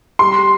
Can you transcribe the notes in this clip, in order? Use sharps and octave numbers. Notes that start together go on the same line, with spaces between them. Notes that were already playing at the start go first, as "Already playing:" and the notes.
G3 C6